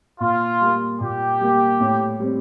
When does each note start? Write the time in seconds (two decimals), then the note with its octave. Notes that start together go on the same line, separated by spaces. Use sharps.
0.20 A#2 F4
0.61 G3 A#3
1.00 A#2 G4
1.40 G3 A#3
1.80 A2
2.20 G3 C4